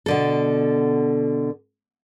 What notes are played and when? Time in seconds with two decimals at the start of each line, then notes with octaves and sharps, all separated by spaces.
0.06 B2 D3 A4